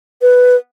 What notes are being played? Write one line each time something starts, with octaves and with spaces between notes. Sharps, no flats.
B4